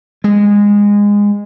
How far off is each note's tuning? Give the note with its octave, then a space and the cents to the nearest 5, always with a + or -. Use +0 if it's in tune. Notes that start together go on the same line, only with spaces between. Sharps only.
G#3 -20